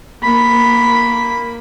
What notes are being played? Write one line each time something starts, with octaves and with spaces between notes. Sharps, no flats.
A#3 B5